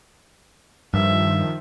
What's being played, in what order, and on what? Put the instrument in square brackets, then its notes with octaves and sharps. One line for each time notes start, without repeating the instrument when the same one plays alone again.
[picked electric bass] G2 [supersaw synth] D#3 F3 [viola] E5